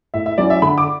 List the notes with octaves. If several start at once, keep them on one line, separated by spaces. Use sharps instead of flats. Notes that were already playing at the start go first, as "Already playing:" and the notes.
A2 E5
E5
F#3 C#4 E4 D5
E5
D3 B5
D6